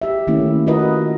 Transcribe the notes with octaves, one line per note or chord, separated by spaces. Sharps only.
G4 E5
D#3 A3 A#3 C#4 E4
F4 F#4 A#4 B4 D#5